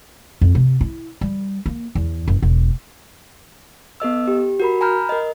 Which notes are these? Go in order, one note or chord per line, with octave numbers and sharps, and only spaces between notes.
F2
C3
E4
G3
A#3
E2
F#1
E1
B3 A4 D#5 E6
G4
F#4 A#4 B5
G#5 A#5 B5 F6 G6
A#4 D#5